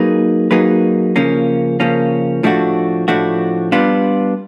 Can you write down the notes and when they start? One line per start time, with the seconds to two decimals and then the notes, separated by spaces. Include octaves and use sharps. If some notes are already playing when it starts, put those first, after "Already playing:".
Already playing: F#3 A#3 D#4 G#4 B4
0.51 F#3 A#3 D#4 G#4 B4
1.16 C#3 F3 A#3 C#4
1.80 C#3 F3 A#3 C#4
2.43 A2 F3 A3 D4 F#4
3.08 A2 F3 A3 D4 F#4
3.72 G3 B3 D4 F4